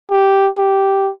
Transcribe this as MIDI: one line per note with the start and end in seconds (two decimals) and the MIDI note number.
0.10 0.49 67
0.58 1.10 67